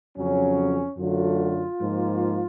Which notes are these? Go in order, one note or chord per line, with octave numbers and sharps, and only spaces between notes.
F2 C#3 F#3 C#4
F#2 D3 F#3 A3 F4
G#2 F3 A#3